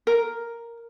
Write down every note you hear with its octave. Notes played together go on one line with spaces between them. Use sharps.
A#4